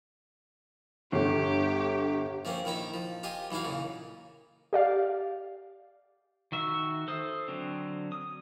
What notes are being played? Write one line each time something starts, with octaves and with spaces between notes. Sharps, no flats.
G1 D3 G4
F3 A#3 C4 C#4
A#1 D#3 E4 A#5 B5
F3
F4 G4 D#5 G#5
B1 E3 D#4 E4 F5
A#2 C#3
G4 D5 F5
D#3 F#4 E5
A4 C5 D#6
D3 F#3 C4
D#6